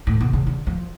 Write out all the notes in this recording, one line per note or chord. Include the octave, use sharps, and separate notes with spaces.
A2
B2
C#3
D3
F3